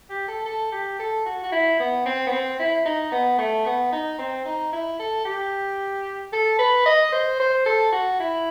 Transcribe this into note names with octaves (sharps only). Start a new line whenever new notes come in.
G4
A4
A4
G4
A4
F#4
F#4
E4
B3
C4
B3
C4
E4
D#4
B3
A3
B3
D#4
C4
D#4
E4
A4
G4
A4
B4
D#5
C5
C5
A4
F#4
E4